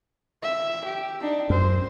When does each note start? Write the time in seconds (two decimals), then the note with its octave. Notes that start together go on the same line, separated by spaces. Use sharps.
0.42 E5
0.85 G4
1.21 D4 D#4
1.50 F#2 C5